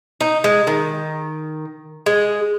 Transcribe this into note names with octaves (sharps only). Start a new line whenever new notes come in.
D#4
G#3
D#3
G#3